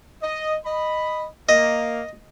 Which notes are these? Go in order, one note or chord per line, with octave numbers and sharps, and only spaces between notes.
D#5
D#5 B5
A#3 D#5